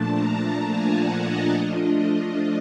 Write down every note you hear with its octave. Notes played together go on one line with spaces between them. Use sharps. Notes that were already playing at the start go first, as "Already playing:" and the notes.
Already playing: A#2 F3 A3 D4 A5
A#5
A5
G#5
F#5
D#5
F3 A3 D4 F4 D#5
D#5